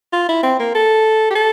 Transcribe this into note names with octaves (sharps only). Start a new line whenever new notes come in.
F4
E4
C4
A#3
A4
G4
A4